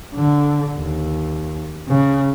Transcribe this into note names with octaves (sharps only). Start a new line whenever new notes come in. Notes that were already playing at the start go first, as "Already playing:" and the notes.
D3
D#2
C#3